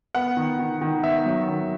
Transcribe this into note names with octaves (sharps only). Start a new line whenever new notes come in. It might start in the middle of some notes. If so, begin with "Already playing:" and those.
B3 F#5
D#3
D#3
D#3
B3 E5
F#3
D#3